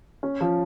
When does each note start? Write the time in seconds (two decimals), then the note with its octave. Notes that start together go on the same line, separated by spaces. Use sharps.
0.23 C#4
0.41 F3